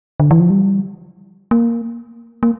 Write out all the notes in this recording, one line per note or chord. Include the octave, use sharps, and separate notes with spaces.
D3
E3
F3
G3
A#3
A#3